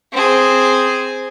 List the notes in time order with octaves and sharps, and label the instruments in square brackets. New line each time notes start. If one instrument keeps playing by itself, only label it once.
[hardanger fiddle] C4 G#4